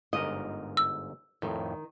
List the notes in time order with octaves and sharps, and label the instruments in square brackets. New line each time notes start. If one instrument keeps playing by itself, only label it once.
[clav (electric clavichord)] G1 G#2 A#4 [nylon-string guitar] D#5
[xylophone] E6
[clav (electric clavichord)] F2 A2 [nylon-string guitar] D#3